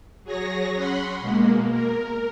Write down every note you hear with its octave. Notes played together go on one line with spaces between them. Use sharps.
F#3 G#4 C#5 A#6
C#4 F#5 B5 C6
B2 G#3 A#3
A#4